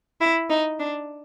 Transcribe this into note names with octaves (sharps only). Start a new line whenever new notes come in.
E4
D#4
D4